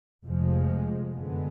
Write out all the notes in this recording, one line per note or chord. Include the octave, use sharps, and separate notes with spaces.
F1 F2 F3 G#3
F#2 D3 G#3 B3